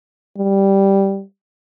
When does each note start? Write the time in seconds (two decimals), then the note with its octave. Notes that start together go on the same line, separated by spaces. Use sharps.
0.38 G3